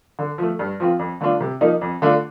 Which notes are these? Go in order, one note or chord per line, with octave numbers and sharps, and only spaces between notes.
D3
F3 A3
G2
F3 C4 F4
F2
D3 A3 D4 F4
C3
F3 A#3 D#4
F2
D3 A3 D4 F4